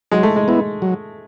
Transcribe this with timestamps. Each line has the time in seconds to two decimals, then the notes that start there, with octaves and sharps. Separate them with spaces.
0.11 F#3 G#3
0.23 A3
0.36 G#3
0.48 B3 E4
0.82 F#3